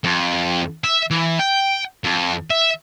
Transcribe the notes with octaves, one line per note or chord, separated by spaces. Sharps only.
F2
E5
E3
G5
F2
E5